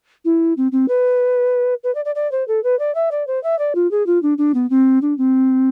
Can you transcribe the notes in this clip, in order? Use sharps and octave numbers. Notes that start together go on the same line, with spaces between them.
E4
C4
C4
B4
B4
D5
D5
D5
C5
A4
B4
D5
E5
D5
C5
E5
D5
F4
G#4
F4
D4
D4
B3
C4
D4
C4